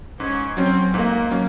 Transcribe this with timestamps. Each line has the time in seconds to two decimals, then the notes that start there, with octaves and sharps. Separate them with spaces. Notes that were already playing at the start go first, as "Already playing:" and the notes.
0.20 G#2 C#4
0.57 F#3 C4 C#4
0.94 G#2 A#3
1.31 F#3 C#4